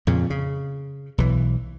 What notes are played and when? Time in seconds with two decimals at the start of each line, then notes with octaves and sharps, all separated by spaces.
0.07 F2 A#2 C#3
0.30 C#3
1.18 B1 E3